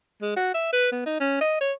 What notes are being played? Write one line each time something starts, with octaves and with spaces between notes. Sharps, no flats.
G#3
F#4
E5
B4
B3
D#4
C#4
D#5
C#5